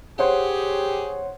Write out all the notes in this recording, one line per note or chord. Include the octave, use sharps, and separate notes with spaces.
G4 G#4 C5 C#5 F#5